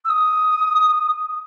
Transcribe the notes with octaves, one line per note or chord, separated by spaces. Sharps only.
E6
D#6